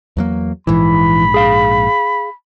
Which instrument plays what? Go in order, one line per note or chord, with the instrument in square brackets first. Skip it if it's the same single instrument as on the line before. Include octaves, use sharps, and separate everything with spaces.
[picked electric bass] E2 F#3 A#3
[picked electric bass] A#1 G#2 [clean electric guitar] E3 [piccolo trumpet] B5
[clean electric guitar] G#4 F5